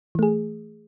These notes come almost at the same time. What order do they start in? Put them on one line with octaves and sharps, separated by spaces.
E3 A3 G#4